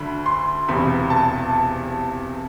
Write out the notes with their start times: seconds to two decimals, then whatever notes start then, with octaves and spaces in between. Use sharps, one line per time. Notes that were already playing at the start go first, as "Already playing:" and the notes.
Already playing: D2 D3 B5
0.26 C6
0.68 E1 E2 C3 B5
1.10 A5